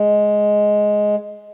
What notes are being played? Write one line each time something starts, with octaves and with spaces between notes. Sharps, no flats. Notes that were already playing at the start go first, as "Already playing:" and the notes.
Already playing: G#3